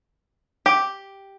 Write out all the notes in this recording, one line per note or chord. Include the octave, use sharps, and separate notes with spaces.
G4